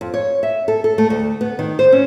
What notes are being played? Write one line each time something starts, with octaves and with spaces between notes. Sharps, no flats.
F2
C#5
E5
A4
A4
A3
D2
B3
D#3
C5
C#4